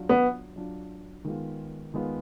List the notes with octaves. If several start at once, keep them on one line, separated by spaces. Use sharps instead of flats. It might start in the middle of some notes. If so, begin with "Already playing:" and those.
Already playing: F#3 D4 F4
B3
F#3 D4 F4
D#3 G#3 B3 F4
D#3 G#3 B3 F4